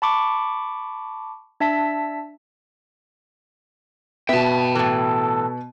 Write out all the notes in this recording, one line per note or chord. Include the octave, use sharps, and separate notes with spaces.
A5 B5 C#6 D6
D4 E5 A5 B6
B2 B3 E5 G5 A5
A2 E3 A4